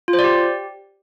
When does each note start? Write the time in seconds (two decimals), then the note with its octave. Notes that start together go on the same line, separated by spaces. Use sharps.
0.08 F4
0.13 C5
0.19 D5
0.24 G4